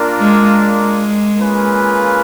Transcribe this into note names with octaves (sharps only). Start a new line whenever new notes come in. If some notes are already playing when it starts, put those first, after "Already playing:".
Already playing: A#3 D4 F4 A#4 D5
G#3
G#3
A#3 C#4 F4 G#4 B4